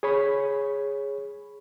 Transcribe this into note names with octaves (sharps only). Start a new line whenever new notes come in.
G#4 C#5 B5